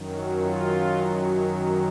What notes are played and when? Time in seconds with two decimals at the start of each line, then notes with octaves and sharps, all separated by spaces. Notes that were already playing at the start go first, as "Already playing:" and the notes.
Already playing: F#2 D#3 F#3
0.12 F#4
0.39 F4